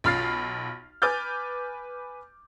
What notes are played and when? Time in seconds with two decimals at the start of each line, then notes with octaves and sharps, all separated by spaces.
0.04 B1 F4 B5 F6 A6 C7
1.02 B4 G#5 D6 F6 G6 A6